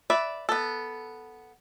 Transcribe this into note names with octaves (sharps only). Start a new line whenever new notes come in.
B4 D5 E5
B3 A4